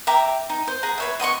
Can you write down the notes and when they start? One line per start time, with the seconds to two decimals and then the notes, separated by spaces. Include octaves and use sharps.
0.07 E5 G5 A#5 D6
0.49 D#4
0.68 C5
0.83 G#4 F#5 A#5
0.98 B4 C#5 E5
1.20 D#5 F#5 C6 C#6